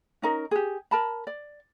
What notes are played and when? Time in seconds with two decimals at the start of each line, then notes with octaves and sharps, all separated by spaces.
0.22 C#4 D#4 A#4
0.51 G4 G#4
0.91 A#4 A5 B5
1.27 D5